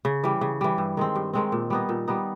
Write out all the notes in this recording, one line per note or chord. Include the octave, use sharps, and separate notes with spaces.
C#3
E3 G3
C#3
E3 G3
G2
D#3 G#3 C4
G2
D#3 G#3 C4
A#2
G3 B3 D#4
A#2
G3 B3 D#4